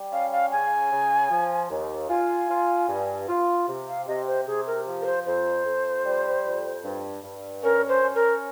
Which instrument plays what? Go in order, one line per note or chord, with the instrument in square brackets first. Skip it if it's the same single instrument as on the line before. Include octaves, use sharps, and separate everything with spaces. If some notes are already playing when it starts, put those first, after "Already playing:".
Already playing: [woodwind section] G3
[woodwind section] C#4 [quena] F5
[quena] F5
[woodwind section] C#3 [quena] G#5
[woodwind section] C#3
F3
D#2
[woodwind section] F4 [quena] G#5
[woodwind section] F4
G2
F4
C3
[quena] F5
[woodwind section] C3 [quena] D#5
[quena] C5
[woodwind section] C3 [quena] G#4
[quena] A#4
[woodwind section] F3
[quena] A#4
C5
[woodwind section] F2 [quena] C5
[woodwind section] F2
G3
F2
G2
G2
[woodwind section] C#4 [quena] A#4
[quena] C5
[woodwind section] C#4
[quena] A#4